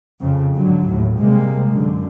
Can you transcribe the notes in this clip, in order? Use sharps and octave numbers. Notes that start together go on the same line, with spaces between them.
F2 C#3
G#2 D3 F#3
D#2 A2
C3 G3 G#3 A#3
F#2 D3